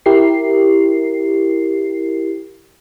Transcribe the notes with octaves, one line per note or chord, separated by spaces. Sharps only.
E4 G4 A#4 C7